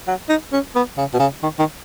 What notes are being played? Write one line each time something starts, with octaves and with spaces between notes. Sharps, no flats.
F#3
D#4
C#4
B3
C#3
B2
C#3
D#3
D#3